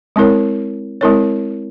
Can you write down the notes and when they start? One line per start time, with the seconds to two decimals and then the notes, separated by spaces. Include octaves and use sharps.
0.16 G#3 C4 E4 A#4 C#5
1.01 G#3 C4 E4 A#4 C#5